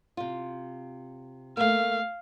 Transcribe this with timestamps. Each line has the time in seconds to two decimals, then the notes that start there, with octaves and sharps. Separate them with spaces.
0.17 C3 F4
1.57 A3 A#3 F5